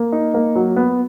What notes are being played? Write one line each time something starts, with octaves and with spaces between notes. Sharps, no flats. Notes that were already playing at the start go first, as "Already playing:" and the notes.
Already playing: A#3
D#4
A#3
F#3
B3